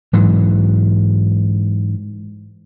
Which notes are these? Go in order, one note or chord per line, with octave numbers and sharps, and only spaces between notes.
G#2 E3 F#3